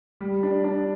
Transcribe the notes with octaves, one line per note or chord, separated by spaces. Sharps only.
G3
D4
D4